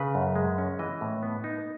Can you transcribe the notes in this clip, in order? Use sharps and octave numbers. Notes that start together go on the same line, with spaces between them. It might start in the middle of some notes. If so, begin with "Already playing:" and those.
Already playing: C#3 B4
F#2
G#3
C#4
E3 D#5
A2
B3
D#4